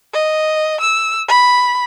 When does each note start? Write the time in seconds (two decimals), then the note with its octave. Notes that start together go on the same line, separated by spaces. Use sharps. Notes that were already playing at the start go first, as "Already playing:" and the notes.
0.13 D#5
0.81 E6
1.28 B5